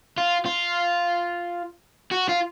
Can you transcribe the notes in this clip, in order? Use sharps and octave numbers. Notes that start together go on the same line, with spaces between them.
F4
F4
F#4
F4